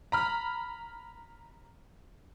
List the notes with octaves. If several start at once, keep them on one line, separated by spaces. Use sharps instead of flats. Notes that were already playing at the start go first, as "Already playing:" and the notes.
A#5 B5 F6